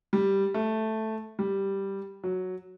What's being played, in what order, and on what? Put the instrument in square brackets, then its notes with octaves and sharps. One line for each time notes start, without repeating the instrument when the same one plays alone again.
[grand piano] G3
A3
G3
F#3